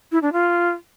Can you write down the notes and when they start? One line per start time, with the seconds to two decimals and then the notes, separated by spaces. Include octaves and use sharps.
0.12 E4
0.22 D4
0.33 F4